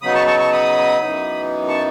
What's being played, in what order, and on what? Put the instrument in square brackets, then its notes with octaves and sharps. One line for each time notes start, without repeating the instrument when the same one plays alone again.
[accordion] C#3 F#3 B3 D#4 B5 D#6
A5 C#6
A5 C#6
A5 C#6
B5 D#6
F#2 C#3 E3 B3 D#4
A5 C#6